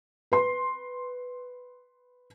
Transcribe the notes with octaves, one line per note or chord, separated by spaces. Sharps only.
B4 C6